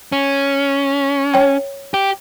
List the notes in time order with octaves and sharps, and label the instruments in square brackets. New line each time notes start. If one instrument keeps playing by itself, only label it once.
[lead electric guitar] C#4
[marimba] C#5 G5
[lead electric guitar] G4